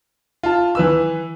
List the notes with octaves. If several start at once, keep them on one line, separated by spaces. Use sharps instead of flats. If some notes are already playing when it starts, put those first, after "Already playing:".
F4 A5
E3 B4 E6